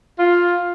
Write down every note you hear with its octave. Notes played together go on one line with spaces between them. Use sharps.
F4